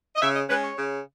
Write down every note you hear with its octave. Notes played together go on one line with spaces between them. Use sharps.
D#5
C#3 E5
D#5
G#3 C#4 B4
C#5
C#3